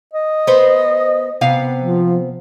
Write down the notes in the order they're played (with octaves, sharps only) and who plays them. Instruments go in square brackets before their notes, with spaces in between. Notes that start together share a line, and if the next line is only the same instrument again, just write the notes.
[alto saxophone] D#5
[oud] B3 C5
C3 B3 F5
[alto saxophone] F3